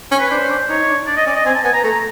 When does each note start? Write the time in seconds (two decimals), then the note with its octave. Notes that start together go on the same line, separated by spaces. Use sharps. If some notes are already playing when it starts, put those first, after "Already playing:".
0.12 C#4
0.20 B4
0.31 D4 C5
0.43 C#4
0.50 D4
0.69 D#4 C#5
0.79 D#4
0.88 D4
1.07 D4 D5
1.17 D#5
1.26 C#4 D5
1.36 D#5
1.45 C4 G#5
1.55 A5
1.64 B3 G#5
1.73 A#5
1.84 A3 A#5